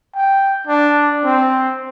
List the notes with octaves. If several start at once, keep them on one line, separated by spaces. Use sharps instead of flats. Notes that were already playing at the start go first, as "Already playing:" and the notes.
G5
D4
C4